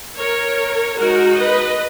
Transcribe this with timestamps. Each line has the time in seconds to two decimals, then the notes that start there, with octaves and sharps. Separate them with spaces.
0.16 A#4 C#5
0.97 G#3 D#4 F#4 A#4
1.38 B4 D#5